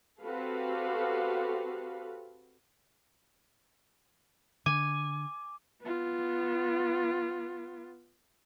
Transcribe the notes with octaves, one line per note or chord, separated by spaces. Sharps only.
C4 F#4 G4 A4 B4 F5
D3 G#5 D6
B3 F4